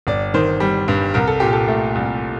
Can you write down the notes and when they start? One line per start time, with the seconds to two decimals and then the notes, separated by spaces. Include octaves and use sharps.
0.07 G1 D5
0.34 D#3 C5
0.60 G3
0.88 G2
1.14 C2 A#4
1.28 A4
1.40 A#2 G4
1.53 A4
1.68 A3
1.95 C2